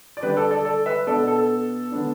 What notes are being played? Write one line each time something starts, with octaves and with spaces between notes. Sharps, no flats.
D5
D3 G3 D4 G4 B4
A4 D5
A4 D5
A4 D5
B4 E5
B2 B3 D4 A4 D5
A4
A4
D3 B3 D4